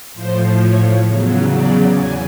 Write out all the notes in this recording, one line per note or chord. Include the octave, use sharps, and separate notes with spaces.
A2 F3 C5
C#5
E2 C#3 F#3
D5
E2 G#5